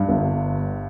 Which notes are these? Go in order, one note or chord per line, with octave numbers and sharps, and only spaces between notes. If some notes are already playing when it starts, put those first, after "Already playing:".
Already playing: G2
G1